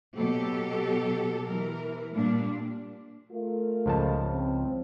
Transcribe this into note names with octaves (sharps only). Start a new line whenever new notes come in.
B2 F#3 G4 A4
E3 A#4
A#2 G3 D4
A3 F4 A#4
C#2 F3 A5
C4